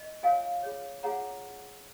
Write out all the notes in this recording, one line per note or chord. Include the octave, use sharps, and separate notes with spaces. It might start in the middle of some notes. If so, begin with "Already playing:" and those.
Already playing: D#5
F4 A#4 C#5 F5 G#5
F4 G#4 C#5
F4 G#4 C#5 F#5 A#5